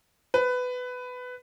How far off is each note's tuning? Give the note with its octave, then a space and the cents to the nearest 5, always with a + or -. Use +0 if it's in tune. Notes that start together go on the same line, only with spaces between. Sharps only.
B4 +15